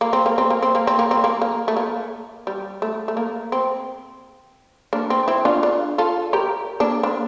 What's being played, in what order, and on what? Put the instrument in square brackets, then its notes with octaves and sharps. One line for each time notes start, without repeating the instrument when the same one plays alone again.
[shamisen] A#3
C4
A#3
C4
A#3
C4
A#3
C4
A#3
C4
A#3
A#3
A3
A#3
G3
A3
A3
A#3
C4
A#3 D4
C4
C4 E4
D4 F4
D4 F4
F4 A4
G4 A#4
A#3 D4
A#3 D4